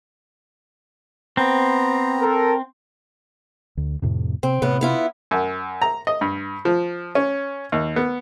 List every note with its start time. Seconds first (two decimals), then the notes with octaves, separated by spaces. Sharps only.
1.37 B3 C4 A#5
2.21 A4 A#4
3.77 D2
4.02 F2 A2 C3
4.43 C3 C4
4.62 A2 C3 B3
4.81 B3 E4 F4
5.31 F#2
5.82 A#5
6.07 D#5
6.21 G2
6.65 F3
7.15 C#4
7.72 D#2
7.96 B3